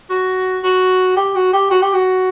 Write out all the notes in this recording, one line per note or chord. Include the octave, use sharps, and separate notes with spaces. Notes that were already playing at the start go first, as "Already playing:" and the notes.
F#4
F#4
G4
F#4
G4
F#4
G4
F#4